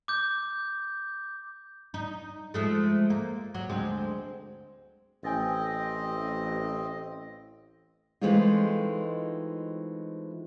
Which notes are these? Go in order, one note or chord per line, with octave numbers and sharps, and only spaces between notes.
D6 G6
D#4
F3 G#3 A3
A#3
F#3
D2 G#3 C4
A1 C4 D#5 G5 G#5 A6
E3 G#3 A3 C4 D#4 F4